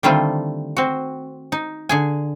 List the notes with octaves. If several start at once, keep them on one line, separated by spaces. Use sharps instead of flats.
D3 D#3 G3 A3 C4 F4
C4 F#4
D#4
D3 G#4 G#5